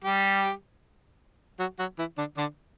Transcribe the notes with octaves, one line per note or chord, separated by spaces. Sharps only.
G3 G4
F#3 F#4
F#3 F#4
E3 E4
D3 D4
D3 D4